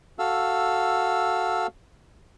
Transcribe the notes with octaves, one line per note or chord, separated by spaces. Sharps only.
F#4 A4 F5 E6